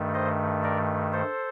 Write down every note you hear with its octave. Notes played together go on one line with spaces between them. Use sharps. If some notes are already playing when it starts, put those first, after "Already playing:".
Already playing: G2 D#3 A3
C5 D#5
A#4 D5
A4 C5